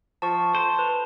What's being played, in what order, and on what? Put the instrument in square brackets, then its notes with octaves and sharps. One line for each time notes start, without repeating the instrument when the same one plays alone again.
[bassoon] F3 [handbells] A5 C#6
[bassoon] A4 [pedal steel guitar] C5
[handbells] B4